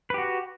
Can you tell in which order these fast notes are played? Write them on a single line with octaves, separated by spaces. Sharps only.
B4 G4 F#4